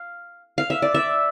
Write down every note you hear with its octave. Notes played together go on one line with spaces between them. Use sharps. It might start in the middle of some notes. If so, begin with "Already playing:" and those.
Already playing: F5
F5
E5
D5
E5